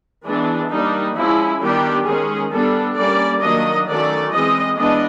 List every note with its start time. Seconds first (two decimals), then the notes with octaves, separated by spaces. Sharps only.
0.25 E3 G#3 B3 D4
0.71 G3 A#3 D4 D#4
1.16 F3 G#3 C#4 E4
1.62 D#3 G3 B3 D4 G4
2.06 D#3 G#3 C#4 G#4
2.52 G3 B3 D4 A4
2.97 G3 A#3 C#4 D5
3.42 D#3 F#3 A#3 D4 D#5
3.88 D#3 F#3 A3 C#4 D5
4.33 E3 G#3 C4 D#5
4.78 E3 G#3 B3 D4 D#5